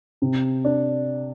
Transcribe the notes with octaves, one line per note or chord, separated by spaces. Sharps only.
C3
D4